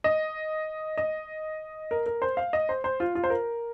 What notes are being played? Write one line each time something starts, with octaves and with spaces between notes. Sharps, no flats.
D#5
D#5
A#4
A#4
C5
F5
D#5
C5
C5
F4
F4
C5
A#4